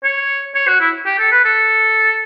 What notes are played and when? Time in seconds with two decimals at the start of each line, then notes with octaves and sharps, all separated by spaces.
0.04 C#5
0.55 C#5
0.67 F#4
0.80 E4
1.06 G4
1.19 A4
1.31 B4
1.44 A4